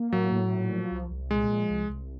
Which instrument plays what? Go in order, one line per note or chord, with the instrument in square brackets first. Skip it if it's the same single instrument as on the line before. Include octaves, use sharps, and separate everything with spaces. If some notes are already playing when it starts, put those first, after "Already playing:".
Already playing: [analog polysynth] A#3
[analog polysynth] A2 [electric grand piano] F#3
[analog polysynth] A2
A#2
F3
C2
C2
[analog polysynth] A#2 [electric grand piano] G#3
[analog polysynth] F3
C2
C2